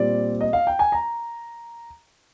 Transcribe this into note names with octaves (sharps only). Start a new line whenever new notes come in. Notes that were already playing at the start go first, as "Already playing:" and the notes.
Already playing: A#2 G3 C4 D5
D#5
F5
G5
G#5
A#5